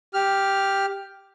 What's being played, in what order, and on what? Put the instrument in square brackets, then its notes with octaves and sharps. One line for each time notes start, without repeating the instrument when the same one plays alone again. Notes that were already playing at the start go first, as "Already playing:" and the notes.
[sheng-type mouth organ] G4 F6